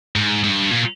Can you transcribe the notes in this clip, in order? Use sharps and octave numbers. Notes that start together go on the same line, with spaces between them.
G#2
G#2
G2
A#2